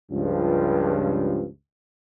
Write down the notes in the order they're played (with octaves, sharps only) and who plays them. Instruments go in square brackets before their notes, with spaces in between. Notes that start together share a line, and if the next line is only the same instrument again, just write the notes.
[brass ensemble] C#2 G2 F3